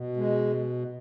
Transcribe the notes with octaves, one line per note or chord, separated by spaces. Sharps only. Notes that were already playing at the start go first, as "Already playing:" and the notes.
Already playing: B2
G#3